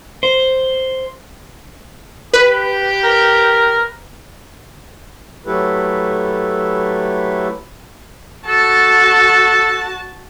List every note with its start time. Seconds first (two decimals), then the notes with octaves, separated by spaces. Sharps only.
0.23 C5
2.33 G4 B4
3.04 A#4
5.46 F#3 A3 E4 G4 A4 B4
8.47 F#4 A4 A5